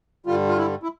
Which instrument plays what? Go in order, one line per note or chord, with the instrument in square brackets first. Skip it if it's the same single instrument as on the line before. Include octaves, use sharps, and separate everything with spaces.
[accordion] G2 D3 G3 F4
F4
E4
E4